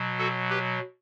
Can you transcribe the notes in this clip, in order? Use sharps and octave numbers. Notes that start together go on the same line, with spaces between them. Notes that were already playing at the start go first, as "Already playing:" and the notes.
Already playing: B2 F#3
F#4 A4
G4 B4